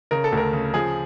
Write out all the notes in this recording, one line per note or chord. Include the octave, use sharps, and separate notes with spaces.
C#3 A#4
A4
D2
A#4
C#3
F3 G#4